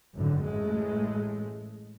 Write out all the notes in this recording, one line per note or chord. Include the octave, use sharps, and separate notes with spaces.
G#1 F#2 A2 D3
A1 G#3 A3